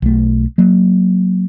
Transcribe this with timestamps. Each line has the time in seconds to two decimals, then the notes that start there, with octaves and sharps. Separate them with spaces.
0.02 B1 A3
0.58 F#3 A#3